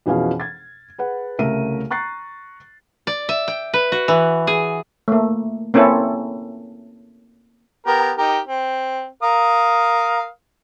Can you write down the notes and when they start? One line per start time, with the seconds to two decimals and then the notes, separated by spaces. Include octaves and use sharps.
0.06 F2 B2 E3 C#4 G#4 F5
0.40 G#6 A6
0.98 G#4 B4 F#5
1.39 C2 C#3 A3 A#4 E5 D#7
1.90 A#5 C#6 F#6 A6 C7
3.07 D5
3.29 E5
3.48 G5
3.74 B4
3.92 F#4
4.08 E3
4.47 G#4
5.08 A3 A#3
5.74 A#3 C4 C#4 E4 A4
7.87 B3 G4 A#4
8.18 D#4 G4 A#4
8.48 C4
9.23 A#4 F5 D#6